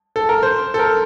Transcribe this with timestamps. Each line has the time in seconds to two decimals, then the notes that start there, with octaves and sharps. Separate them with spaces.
0.16 A4
0.29 A#4
0.43 C5
0.74 A4
0.79 A#4